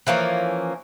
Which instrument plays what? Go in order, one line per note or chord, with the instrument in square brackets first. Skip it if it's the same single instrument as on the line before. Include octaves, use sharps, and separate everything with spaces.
[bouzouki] E3 F3 A#3 C#4